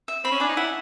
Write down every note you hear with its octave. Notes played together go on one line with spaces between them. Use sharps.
E5
C4 B5
C#4
D4 G#5
D#4
E4 F#5